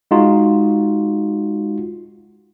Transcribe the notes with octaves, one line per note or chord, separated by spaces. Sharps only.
G#3 D#4 F4 F#4